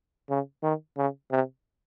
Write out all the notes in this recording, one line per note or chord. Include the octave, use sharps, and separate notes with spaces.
C#3
D#3
C#3
C3